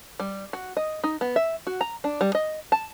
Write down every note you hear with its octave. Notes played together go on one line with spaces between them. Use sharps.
G3
F#4
D#5
D#4
B3
E5
F#4
A#5
D4
G3
D#5
A5